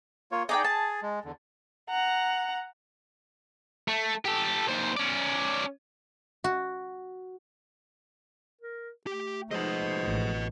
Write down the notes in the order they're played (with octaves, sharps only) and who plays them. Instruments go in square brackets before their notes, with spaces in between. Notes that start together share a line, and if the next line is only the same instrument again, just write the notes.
[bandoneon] A#3 F4 C#5
[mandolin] D#4 D5 G5 [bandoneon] G#4
[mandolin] A5
[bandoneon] G#3
E2 D3
[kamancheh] F#5 A#5
[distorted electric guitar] A3
G4 A4
D#2 C5
C#4 D5
[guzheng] F#4
[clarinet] A#4
[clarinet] A3 [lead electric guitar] G4
[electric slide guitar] F3 G#3 A3 [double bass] D#4 [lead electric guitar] B4 D#5 [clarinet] C5
[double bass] A1